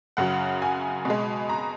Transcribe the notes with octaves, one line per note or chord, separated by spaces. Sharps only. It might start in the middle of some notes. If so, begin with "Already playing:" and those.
F#2 C#3 F#3 F#5
G#5
B2 G#3
A#5